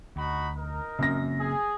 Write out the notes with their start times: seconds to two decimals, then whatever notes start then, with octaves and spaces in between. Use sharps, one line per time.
0.16 D2 D#4 F#4 B5
0.56 D#4 A#4
0.99 F#2 C#3 A#3 C4 A#6
1.39 G#4